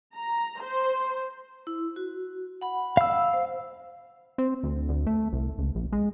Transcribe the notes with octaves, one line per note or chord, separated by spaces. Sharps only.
A#5
C5
E4
F#4
F#5 B5
F5 E6
C5
C4
D2
D2
A3
C2
C#2
A#1
G#3